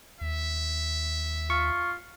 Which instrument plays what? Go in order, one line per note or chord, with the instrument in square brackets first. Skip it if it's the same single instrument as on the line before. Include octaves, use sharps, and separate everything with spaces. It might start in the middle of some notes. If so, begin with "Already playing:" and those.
[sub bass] D#2 [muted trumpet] E5
[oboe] F4 [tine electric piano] C#6